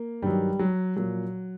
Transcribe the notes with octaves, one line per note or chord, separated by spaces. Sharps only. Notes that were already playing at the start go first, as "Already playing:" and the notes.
Already playing: A#3
G2 D#3 F#3 G3
F#3
A#2 F3 F#3